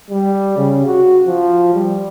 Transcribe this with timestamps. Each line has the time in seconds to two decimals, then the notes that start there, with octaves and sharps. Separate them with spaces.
0.11 G3
0.57 C#3
0.86 F#4
1.27 F3
1.74 G3